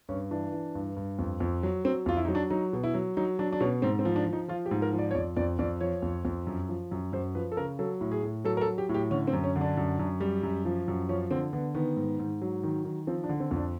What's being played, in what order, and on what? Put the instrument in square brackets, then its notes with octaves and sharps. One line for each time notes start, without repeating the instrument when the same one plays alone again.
[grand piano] G2 C#4
E3 D4
E3
G2
G2
F2
F2
F#3
F#3 C4
F2 F4
E4
F#3 D#4
D4
F#3 D#4
B2
E4
F#3
F#3 D#4
F#3 D4
D4
B2 C#4
G#2 C4
C4
F3
D4
F3
D#4
F3 F4
G4
G#2
A#4
F3
D5
C#5
F2 D5
F2 D5
F2 D5
F3 C#5
F2
F2
F#2
F3
F#2
F#2 C5
F3 B4
A4
C#3 A#4
F#3 A4
A2
G#4
A2
F#3 A4
A#4
A4
F#3
G4
A2
G4
D3 C#4
C4
F#2
C#4
D3
D4
F#2
F#2
G3
F#2
F3
F#2
F3 C#4
D3 C4
D3 B3
D#3 B3
G#2
G#2
F#3
D#3
D#3
F3 C4
D4
D3
C4
F2
D4